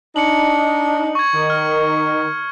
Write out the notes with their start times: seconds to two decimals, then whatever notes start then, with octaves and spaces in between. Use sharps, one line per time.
0.16 D4 D#4 C#7 F#7
1.15 C#6 G#6
1.35 D#3
1.50 F6